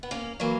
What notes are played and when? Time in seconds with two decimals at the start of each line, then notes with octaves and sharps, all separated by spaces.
0.03 B3
0.11 A#3 C#4
0.40 E3 F#3 A#3